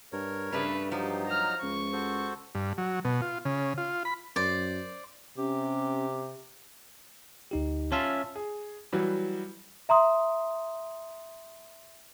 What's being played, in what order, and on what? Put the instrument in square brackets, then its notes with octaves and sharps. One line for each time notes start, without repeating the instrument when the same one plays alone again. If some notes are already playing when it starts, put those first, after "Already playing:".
[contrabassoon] G2 [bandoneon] A#4 C#5
[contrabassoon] G2 [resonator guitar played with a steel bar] C#3 A3 D4 [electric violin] B4
[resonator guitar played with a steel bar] F3 [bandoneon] F#3 D#4 [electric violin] G4
[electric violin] A#5 F6
[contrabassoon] C#2 [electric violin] C#6
[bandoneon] F#4 A4 C5
[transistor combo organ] G2
F#3
B2
F4
C#3
F4
B5
[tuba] F#2 [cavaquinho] C5 D5
[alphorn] C3 [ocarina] C#4 [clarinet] G4
[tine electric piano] D2 D#4 G4
[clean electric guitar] C#4 F4 E5 [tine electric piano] C#5 A5
[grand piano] G#4
E3 F#3 G3
[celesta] E5 A#5 C6 D#6